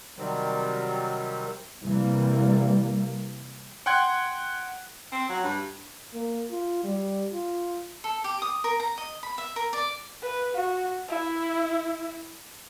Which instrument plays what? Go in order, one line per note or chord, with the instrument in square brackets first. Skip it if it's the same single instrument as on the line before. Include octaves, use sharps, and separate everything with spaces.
[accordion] C3 D#3 F#3 G3 C4
[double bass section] C3 E3 G3 A#3
[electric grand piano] F#5 G5 C6 F#6 G#6
[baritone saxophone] C4
F#3
G2
[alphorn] A#3
F4
G3
F4
[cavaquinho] A4
G4
D#6
A#4
A#5
D#5
B5
E5
A#4
D5
[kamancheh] B4
F#4
E4